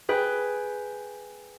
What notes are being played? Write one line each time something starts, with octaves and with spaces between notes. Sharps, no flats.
G#4 B4 G5